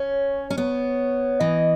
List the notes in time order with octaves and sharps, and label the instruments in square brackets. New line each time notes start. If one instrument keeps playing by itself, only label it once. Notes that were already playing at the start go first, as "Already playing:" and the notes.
Already playing: [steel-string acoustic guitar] C#4 [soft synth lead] C#5
[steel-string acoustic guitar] C#4
B3
[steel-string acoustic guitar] E3 [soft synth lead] D#5